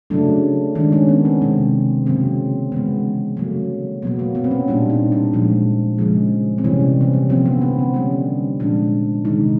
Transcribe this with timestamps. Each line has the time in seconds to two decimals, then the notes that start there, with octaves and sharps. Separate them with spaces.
0.10 C#3 F#3 A3 D4
0.75 D#3 G#3 D4
0.92 C#4
1.09 B3
1.25 C4
1.42 C3 D#3 G#3 C4
2.06 C#3 F#3 A#3 C4
2.72 C#3 E3 G#3 B3
3.37 C#3 F#3 A3 A#3
4.02 B2 F#3 A#3 B3
4.19 A#3
4.35 B3
4.44 C4
4.51 C#4
4.68 A#2 G3 A#3 D4
4.90 D#4
5.12 D4
5.33 A#2 F3 G#3
5.98 C#3 F3 G#3
6.58 C4
6.64 C3 E3 G3 A#3 C#4
6.80 C4
7.01 C4
7.13 C#4
7.29 D3 F3 A#3 C4
7.46 B3
7.61 B3
7.79 C4
7.94 D3 G3 A#3 C#4
8.60 A#2 F3 G#3 D4
9.25 C3 D#3 G#3 D#4